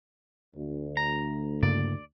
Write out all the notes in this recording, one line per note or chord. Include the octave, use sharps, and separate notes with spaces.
D2
A#5
G2 C#3 A#3 D5